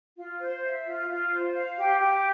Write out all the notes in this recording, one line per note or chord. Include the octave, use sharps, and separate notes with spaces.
F4
C5
E5
F4
F4
C5
F5
G4
G4